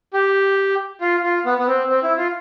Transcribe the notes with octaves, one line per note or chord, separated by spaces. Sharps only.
G4
F4
F4
B3
B3
C4
C4
E4
F4